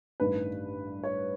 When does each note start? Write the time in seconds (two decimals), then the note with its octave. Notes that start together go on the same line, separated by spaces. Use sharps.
0.20 A1 G2 D#3 B4
1.03 C#5